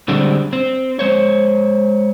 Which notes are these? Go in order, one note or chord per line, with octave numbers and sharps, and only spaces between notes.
D3 G3 G#3 C4 D4
C4
G#3 C5 C#5